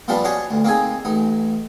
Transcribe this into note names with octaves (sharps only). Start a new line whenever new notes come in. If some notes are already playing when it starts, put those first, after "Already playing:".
A#2 F3 G3 B3 D4 F4
C#4 D4 F#4 C5 C#5 D#5
D2
A#3 C4 D#4 G#4 G#5
A1 D#4